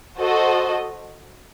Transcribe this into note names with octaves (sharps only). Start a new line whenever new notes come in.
F#4 A4 C5 D#5